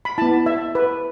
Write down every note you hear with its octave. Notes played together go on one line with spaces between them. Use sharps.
B5
B3 E4 A5
E5
B4